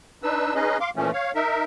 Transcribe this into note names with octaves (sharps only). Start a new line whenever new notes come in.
D4 D#4 B4 E6
C#4 D#4 G#4 B4 D#5
F5 C6 D6
A#2 E3 F3 A3 C#4
C#5 F5
D#4 A#4 E5